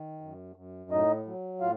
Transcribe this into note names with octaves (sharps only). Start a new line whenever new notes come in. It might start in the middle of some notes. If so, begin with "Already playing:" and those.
Already playing: D#3
F#2
F#2
A2 D#4 D#5
F#3
A2 F4 F5